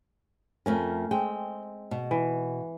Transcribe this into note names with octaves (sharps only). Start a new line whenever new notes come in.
F2 A3 C#4 A#4
G#3 C4 G5
B2
E3